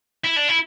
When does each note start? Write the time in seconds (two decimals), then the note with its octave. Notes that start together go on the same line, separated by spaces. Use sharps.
0.24 E4
0.36 D4
0.48 E4